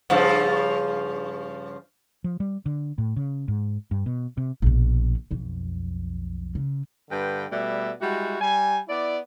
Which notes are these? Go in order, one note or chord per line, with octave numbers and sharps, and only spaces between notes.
G2 C#3 F3
F3
G3
D3
A2
C#3
G#2
G2
B2
C3
A#1 B2
B1 F2
C#3
G2 D3 B4 G5
B2 G3 A3 D5 E5
G3 G#3 E4 F#4
G3 G#5
B3 E4 D5